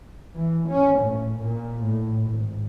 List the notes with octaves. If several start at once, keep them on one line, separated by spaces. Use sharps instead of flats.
E3
C#4
A2
A#2
A2
G#1